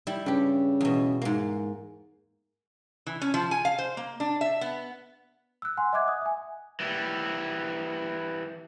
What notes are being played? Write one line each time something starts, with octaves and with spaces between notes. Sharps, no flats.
G3 E4
G2 C#3 G4
E2 B2
G#2 A#3
E3
C#4
F3
G#5
F5
C5
A#3
D4
E5
B3
E6 F#6
F#5 G#5 C6
D#5 E5 F#5 D6 F#6 G#6
D#6
E5 G#5
E3 G3